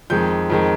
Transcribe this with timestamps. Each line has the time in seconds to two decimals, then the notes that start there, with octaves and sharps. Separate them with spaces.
0.10 F2 D#3 G#3 G6
0.50 F2 D#3 G#3